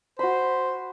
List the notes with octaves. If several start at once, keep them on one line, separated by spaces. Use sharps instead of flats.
F#4 C5 B5